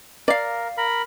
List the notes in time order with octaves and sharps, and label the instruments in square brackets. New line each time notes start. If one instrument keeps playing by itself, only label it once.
[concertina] A#4 [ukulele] D5 F5
[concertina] A#4 B5